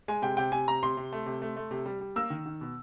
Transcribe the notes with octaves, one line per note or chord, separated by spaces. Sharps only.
G#3 G#5
C3 G5
C3 G5
C3 G#5
C3 A#5
C3 C6
C3
A3
C3
A3
A3
C3
G3
G3
A#3 E6
D#3
D#3
B2